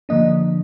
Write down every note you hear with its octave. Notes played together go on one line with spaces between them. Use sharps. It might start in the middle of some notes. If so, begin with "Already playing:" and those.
D3 F3 A#3 D4 D#5